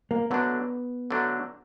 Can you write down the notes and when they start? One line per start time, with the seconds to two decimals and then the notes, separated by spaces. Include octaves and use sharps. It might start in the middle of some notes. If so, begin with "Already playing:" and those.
0.11 A#3
0.30 D3 F#3 A3 B3 D4
1.11 D3 F#3 A3 D4